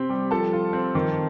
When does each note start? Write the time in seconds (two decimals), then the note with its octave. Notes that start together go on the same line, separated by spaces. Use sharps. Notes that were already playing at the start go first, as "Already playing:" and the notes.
Already playing: C3 C4 G4 G5
0.10 G3
0.31 F3 A4 A5
0.53 F4
0.73 C4
0.95 D#3